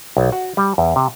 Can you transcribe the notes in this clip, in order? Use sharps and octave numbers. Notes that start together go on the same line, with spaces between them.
B1
F#4
G3
E2
C3